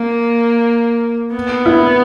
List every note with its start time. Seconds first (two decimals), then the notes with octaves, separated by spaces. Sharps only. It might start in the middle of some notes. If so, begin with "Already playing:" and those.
Already playing: A#3
1.35 B3
1.66 E4